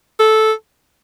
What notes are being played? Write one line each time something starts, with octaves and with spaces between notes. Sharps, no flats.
A4